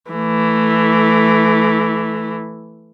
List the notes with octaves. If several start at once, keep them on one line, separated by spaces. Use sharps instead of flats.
E3 A3